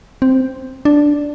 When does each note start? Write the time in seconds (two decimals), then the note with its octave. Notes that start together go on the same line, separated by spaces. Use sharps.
0.22 C4
0.85 D4